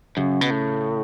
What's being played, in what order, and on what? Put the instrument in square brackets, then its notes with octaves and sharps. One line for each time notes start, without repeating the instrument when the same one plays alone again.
[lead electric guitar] F#2 [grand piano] C#3
[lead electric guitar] B2
A2